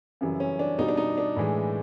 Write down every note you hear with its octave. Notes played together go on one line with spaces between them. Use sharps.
F#2 C#3 E3 G3
C#4
D4
B2 G3 D#4
D4
D#4
D4
A2 E3 G#3